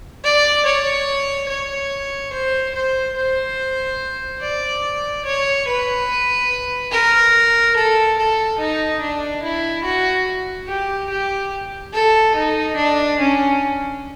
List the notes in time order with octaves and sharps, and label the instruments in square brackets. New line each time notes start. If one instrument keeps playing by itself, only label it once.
[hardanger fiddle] D5
C#5
C#5
C5
C5
C5
D5
C#5
B4
A#4
A4
A4
D#4
D4
E4
F#4
G4
G4
A4
D#4
D4
C#4